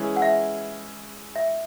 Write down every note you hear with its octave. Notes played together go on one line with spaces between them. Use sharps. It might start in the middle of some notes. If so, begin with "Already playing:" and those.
Already playing: E3 G#3 C#4 E4 G#4
F#5
E5
E5